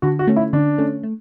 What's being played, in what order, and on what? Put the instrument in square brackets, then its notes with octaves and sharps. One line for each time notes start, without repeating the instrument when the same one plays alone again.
[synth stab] D3 [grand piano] F#4
[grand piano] F#4
[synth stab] A3 C#4
[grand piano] E4
[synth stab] D3 [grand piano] D4
[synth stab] A3 C#4
A3